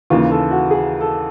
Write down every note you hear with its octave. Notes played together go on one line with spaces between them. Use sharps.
D#2 C#3 E3 F4
A4
F#4
G#4
A4